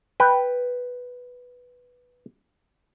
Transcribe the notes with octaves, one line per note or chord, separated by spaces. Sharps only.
B4 G5